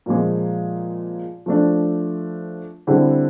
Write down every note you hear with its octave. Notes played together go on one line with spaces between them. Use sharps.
A#2 F3 G#3
F3 A3 D4
D3 G3 C4 E4